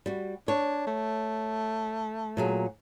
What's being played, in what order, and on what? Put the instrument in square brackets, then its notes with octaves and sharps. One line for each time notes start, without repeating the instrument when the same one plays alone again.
[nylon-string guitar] G3 F#4
[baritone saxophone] D4 [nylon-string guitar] C#5
[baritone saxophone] A3
[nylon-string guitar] A#2 F#3 G#4